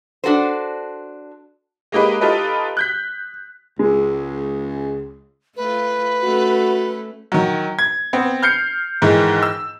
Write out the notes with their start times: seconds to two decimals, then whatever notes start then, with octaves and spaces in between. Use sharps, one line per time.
0.24 D4 F#4 A4 C5
1.92 G#3 A#3 D#4 G4 B4
2.21 D#4 F4 G4 A4 B4 D#5
2.77 F#6 G6 B6
3.79 C#2 G#3
5.56 A3 F4 B4
6.22 A3 C#4 F#4 A4
7.32 D#3 F#3
7.79 G#6
8.13 B3 C4
8.43 F6 G6 C7 C#7
9.02 G#2 D#3 E3 G#3
9.43 E6